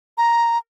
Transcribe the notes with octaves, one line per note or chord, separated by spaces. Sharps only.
A#5